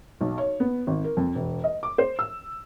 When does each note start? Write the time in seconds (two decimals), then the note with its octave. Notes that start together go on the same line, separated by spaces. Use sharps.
0.21 B1
0.38 C#5
0.60 B3
0.87 G#1
1.04 A#4
1.17 F2
1.35 E1
1.64 D#5
1.83 D6
1.98 C5
2.19 E6